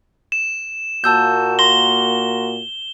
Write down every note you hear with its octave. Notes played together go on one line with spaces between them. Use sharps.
E7
A#2 A#3 F#4 A5 E6 G6
C6 A#6 G7